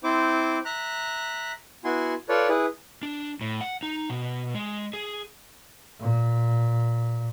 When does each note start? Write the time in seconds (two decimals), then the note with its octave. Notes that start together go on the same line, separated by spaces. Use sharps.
0.04 C4 E4 C5 D6
0.65 E5 A#5 F#6
1.84 B3 E4 F#4 G#5 C6
2.29 F4 A4 B4 C#5 D5
2.49 E4 G#4 B4
3.03 D4
3.41 A2
3.61 F#5
3.83 D#4
4.10 B2
4.55 G#3
4.93 G#4
6.00 A#2